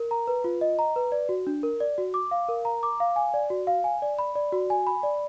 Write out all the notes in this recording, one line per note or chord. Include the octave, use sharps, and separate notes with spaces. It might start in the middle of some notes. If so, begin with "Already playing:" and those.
Already playing: A#4
A#5
B4
F4
D#5
A#5
B4
D5
F#4
D4
A#4
D5
F#4
D6
F5
A#4
A#5
D6
F5
G#5
D5
F#4
F5
G#5
D5
B5
D5
F#4
G#5
B5
D5